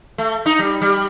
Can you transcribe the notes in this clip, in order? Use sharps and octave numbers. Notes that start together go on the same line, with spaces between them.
A3
D#4
G3
G3